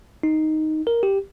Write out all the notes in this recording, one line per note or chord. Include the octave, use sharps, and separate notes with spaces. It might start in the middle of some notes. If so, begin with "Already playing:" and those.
D#4
A#4
G4